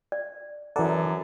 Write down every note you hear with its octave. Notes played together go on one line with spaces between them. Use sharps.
D5
F#2 E3 A4 D5 F#5 A#5